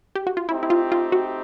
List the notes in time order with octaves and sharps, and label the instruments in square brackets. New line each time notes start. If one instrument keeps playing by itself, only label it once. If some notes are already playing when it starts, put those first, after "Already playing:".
[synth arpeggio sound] G4
F#4
F4
[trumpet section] A3 C4 D#4 G4 [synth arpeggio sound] E4
[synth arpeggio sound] E4
F4
F4
F#4